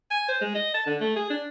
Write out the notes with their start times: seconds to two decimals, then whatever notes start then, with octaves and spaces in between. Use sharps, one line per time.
0.11 G#5
0.29 C5
0.41 G#3
0.55 D#5
0.74 A5
0.87 D3
1.01 A3
1.16 G#4
1.30 D4